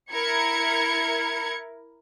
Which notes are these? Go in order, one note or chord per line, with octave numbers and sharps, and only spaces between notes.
E4 A#4 G#6 C#7